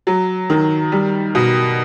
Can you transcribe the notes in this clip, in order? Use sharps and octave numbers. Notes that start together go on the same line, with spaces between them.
F#3
D#3
G3
B2